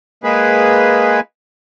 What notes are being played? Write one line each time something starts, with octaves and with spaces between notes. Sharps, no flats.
G#3 A#3 G#4 B4